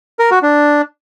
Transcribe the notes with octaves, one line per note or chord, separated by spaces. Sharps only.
A#4
F#4
D4